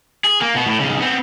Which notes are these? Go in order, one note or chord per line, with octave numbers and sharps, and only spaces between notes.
G#4
A#3
B2 B3
A2
B1 C#3
B3 C4